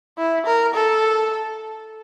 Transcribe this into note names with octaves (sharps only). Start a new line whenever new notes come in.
E4
A#4
A4